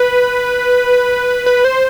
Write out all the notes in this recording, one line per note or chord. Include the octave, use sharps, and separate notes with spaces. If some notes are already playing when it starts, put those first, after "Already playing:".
Already playing: B4
B4
C5